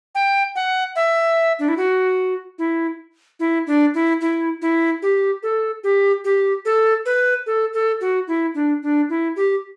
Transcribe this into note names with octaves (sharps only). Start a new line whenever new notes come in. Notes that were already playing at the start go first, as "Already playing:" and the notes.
G5
F#5
E5
D4
E4
F#4
E4
E4
D4
E4
E4
E4
G4
A4
G4
G4
A4
B4
A4
A4
F#4
E4
D4
D4
E4
G4